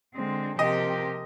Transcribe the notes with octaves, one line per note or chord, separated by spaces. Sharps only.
D3 G#3 C4
C3 F3 C4 G4 A#4 D#5